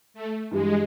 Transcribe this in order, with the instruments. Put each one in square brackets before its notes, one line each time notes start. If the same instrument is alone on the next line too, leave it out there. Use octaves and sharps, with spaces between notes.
[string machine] A3
[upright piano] G2 E3 G3 [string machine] G#3